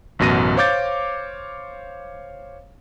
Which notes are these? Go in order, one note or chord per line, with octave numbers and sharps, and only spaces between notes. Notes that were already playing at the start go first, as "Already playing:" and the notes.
A1 F#2 B2 A#6 D#7
C5 C#5 F5 D6 G6 A6